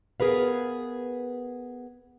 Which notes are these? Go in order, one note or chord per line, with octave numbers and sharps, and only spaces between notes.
B3 G#4 A#4 B4 F5